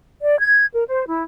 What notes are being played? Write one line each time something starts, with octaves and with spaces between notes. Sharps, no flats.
D5
G#6
A#4
C5
E4